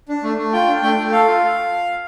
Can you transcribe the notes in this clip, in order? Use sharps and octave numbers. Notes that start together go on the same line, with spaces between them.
D4
A3
A3
F4 G5
D4
A3 G5
A3
A4 F5
F4